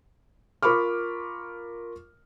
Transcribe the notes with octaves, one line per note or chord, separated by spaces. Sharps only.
F4 A#4 B5 C#6 D6 F6